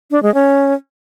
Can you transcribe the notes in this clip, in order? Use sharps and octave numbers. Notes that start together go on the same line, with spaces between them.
D4
G#3
C#4